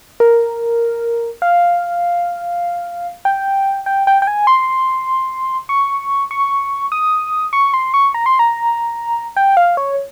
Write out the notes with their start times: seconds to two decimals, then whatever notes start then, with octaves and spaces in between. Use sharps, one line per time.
0.20 A#4
1.42 F5
3.25 G5
3.86 G5
4.07 G5
4.22 G5
4.27 G#5
4.47 C6
5.69 C#6
6.31 C#6
6.92 D#6
7.53 C#6
7.74 C6
7.94 C#6
8.14 A#5
8.26 C6
8.39 A#5
9.37 G5
9.57 F5
9.77 C#5